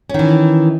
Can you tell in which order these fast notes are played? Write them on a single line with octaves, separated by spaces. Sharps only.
C#4 D#3 E3